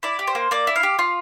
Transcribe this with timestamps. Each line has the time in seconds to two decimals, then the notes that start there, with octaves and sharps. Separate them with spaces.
0.03 E4 D5
0.19 G4
0.27 C5
0.35 A#3
0.51 A#3 D5
0.67 E4
0.76 F5
0.83 G4
0.99 F4